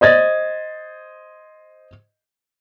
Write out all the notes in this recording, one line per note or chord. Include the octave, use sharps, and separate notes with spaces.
C5 D#5 G#6 A6